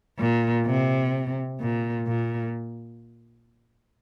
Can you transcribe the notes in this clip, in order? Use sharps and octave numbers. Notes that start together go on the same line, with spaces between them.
A#2
C3
A#2
A#2